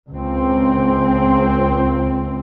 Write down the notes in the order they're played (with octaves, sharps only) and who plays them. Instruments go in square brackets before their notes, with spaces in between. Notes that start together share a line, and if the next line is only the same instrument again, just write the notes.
[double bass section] C#2 C4